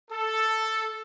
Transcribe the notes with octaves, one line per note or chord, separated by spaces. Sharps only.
A4